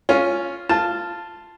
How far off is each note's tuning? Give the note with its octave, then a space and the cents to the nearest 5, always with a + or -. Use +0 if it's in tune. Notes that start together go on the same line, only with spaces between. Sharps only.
C#4 +0 F4 +0
F4 -10 A5 +0